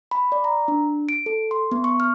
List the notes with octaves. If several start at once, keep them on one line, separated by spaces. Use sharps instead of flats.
B5
D5
A#5
D4
D7
A4
C6
B3
C#6
F6